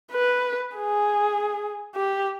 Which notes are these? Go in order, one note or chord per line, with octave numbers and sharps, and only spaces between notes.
B4
G#4
G4